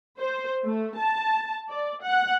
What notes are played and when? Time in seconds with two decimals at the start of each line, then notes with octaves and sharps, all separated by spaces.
0.20 C5
0.64 A3
0.97 A5
1.69 D5
2.03 F#5